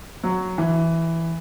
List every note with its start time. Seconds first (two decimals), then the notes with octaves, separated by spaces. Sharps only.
0.23 F#3
0.58 E3